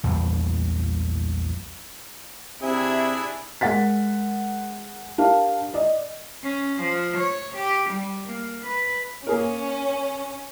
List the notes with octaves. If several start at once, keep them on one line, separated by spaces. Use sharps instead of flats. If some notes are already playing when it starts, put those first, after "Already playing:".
A#1 E2 G3
C3 D4 E4 G#4 E5 G#5
G#3 A#4 F#5 A6 B6
D4 G4 A#4 F5
D5 D#5
C#4
F3
C#5
G4
G3
A#3
B4
A#3 C#4 G#4 A#4